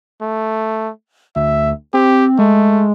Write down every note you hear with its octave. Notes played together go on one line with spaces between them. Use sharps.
A3
D2 E5
C4 G4
G#3 A3